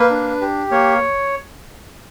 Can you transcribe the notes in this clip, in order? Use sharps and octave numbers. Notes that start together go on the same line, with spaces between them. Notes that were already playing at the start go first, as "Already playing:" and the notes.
Already playing: A#3 B4
D4
G4
A#3 C#5